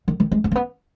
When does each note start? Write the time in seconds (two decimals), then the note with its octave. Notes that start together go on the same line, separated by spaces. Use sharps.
0.08 D#3
0.20 D#3
0.32 G#3
0.44 B3
0.51 A#3
0.55 B3